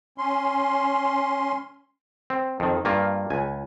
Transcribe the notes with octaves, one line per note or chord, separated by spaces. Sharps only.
C#4 C6
C4
F2 D#3
G2 A#3 F4
C#2 G#5